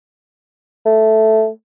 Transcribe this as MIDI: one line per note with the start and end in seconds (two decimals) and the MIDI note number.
0.86 1.48 57